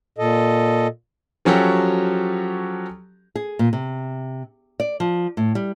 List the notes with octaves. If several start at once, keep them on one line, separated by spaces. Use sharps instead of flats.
A#2 A4 D#5
F3 F#3 C#4 F#4 G4 A4
G#4
A#2
C3
D5
F3
A2
G3